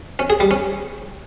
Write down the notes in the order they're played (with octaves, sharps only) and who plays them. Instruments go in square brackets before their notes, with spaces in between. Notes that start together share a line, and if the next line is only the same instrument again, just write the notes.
[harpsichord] C#4
G#4
G3
C#4